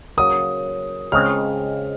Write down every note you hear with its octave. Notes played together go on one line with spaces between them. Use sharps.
C#3 F#3 A#3 D#6
C#2 C#3 G#3 C4 F6